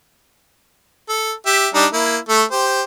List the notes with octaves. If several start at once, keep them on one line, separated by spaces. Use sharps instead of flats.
A4
G4 E5
G3 D4 D#4
A#3 E4
A3 A4
G4 C5